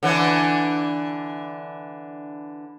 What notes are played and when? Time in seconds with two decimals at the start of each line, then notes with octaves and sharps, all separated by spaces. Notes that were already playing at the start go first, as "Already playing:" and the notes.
0.03 D3 E3 D4